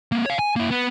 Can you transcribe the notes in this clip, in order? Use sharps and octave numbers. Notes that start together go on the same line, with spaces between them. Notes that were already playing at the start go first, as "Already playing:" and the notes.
A#3 C4
C#5 F5
G#5
A#3 E4
B3